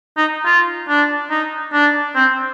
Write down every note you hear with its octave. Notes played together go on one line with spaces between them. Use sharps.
D#4
F4
D4
D#4
D4
C4